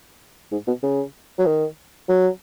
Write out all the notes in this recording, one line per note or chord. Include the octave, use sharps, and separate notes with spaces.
G#2
B2
C#3
F#3
D#3
F#3